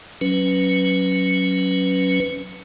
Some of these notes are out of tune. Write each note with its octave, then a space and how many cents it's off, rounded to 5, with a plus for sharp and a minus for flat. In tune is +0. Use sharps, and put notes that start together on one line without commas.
F#3 +0 C#4 +0 B4 +0